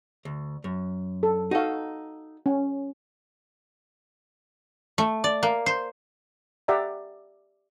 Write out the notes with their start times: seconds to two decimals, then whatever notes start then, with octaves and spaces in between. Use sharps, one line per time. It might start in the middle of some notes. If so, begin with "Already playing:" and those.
0.25 D2
0.64 F#2
1.23 A4
1.51 D#4 F#4 A4 F5
2.46 C#4
4.98 A3
5.24 D5
5.43 A#3
5.66 C5
6.68 G4 D5 E5 F#5 G5 A#5